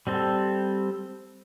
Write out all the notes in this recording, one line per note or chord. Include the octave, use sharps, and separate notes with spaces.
G3 C4 A4